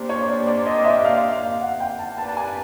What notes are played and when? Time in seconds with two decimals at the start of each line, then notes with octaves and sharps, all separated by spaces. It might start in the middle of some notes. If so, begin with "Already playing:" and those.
Already playing: A#3 D4 G4 C5
0.09 C#5
0.28 D5
0.47 D5
0.66 D#5
0.78 D#5
0.85 E5
1.05 F5
1.33 F5
1.61 F#5
1.80 G5
1.99 A5
2.17 A#3 D4 G4 B4 D5 A5
2.28 A5
2.37 G#5